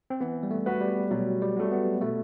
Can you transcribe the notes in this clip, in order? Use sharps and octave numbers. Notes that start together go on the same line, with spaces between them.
C4
E3 B3
G3
A3
B3 F#4 B4
G3
B2 F#3
G3
F#3 A3
B3
B2 A3